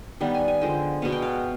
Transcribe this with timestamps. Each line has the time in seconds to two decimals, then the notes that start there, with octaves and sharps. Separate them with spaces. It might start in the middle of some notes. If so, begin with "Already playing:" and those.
0.20 D#3 G3 B3
0.35 G#5
0.48 G#5
0.61 D3 F3 G#3 G5
1.02 B2 G#3 B3 F5
1.12 G5
1.22 F5